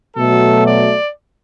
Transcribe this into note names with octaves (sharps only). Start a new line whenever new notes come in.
B2 F#3 A3 A4
D5